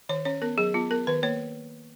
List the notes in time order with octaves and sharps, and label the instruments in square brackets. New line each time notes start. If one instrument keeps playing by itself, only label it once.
[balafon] D#3 C#5
C#4 C#5
B3 A#4
F#3 G#4
B3 F4
B3 A#4
D#3 B4
A#3 C#5